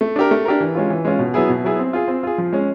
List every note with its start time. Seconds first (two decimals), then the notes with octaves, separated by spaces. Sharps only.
0.01 A3
0.16 D4 G4 A#4
0.31 A3
0.45 D4 G4 A#4
0.60 E3
0.75 G#3 C#4 F4
0.90 E3
1.05 G#3 C#4 F4
1.19 B2
1.34 F#3 B3 E4 G#4
1.49 B2
1.64 F#3 B3 E4 G#4
1.79 C4
1.93 F4 G#4
2.08 C4
2.23 F4 G#4
2.38 F3
2.53 G#3 C#4